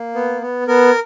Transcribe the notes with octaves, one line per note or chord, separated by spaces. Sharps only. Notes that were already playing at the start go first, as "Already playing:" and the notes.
Already playing: A#3
B3
B3
B3 A#4